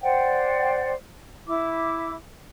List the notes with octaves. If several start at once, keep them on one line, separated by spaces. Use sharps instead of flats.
C5 D5 F#5 G5
E4 D6